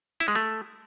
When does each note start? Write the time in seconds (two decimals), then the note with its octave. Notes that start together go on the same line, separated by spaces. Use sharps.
0.20 E4
0.28 G#3
0.35 A3